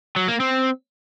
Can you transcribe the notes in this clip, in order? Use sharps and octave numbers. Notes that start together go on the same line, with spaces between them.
F#3
A#3
C4